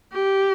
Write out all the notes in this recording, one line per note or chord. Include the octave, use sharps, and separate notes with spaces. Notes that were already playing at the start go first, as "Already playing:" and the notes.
G4